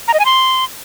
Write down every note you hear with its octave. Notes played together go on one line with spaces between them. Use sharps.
A#5
D#5
G#5
C6